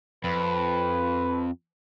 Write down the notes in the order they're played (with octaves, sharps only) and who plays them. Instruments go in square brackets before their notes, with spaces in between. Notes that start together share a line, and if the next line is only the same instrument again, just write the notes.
[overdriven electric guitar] F2 [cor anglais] B4